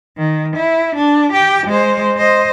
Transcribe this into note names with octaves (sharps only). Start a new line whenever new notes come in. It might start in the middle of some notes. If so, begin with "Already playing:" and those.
D#3
E4
D4
G4 G5
G#3 C5
C5 D#5